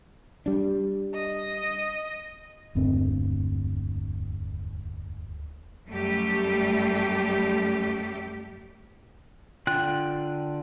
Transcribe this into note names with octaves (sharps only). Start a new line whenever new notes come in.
G3 D4
D#5
E1 D2 G2 C4
F#2 G3 A3 G4
D3 F4 G5 F#6